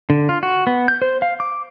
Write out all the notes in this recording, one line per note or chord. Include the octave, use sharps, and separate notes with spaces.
D3
F4
F#4
B3
G6
C5
F5
D6